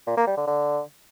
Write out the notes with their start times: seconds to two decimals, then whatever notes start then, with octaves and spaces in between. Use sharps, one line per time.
0.07 A#2
0.17 A#3
0.27 G3
0.37 D3
0.47 D3